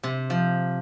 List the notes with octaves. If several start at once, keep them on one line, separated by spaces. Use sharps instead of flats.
C3
F3